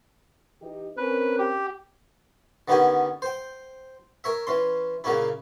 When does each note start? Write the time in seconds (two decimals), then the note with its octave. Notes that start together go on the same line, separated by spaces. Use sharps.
0.61 E3 D#4 G4
0.97 C4 C#4 A#4 B4
1.38 G4
2.68 D3 D#3 B3 C#4 G4 G#5
3.22 C5 G5
4.24 A#4 C#5 E5
4.47 E3 C#4 C6
5.04 A#2 C#3 A#3 C#4 E4